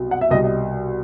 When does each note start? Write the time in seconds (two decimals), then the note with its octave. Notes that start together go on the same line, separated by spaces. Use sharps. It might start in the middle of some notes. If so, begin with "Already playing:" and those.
Already playing: C2 B2 F#3
0.11 F#5
0.21 E5
0.30 C2 B2 G3 D#5
0.44 D#5